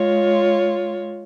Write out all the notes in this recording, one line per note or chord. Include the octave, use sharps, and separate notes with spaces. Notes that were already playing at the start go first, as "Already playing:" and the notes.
Already playing: G#3 F4 C#5